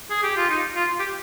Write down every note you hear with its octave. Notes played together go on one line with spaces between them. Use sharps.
G#4
G4
F4
D#4
F4
G4